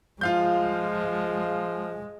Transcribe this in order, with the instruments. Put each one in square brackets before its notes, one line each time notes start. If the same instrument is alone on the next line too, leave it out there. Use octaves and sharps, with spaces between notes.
[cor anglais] F3 [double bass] G#3 [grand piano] F4 F5 G6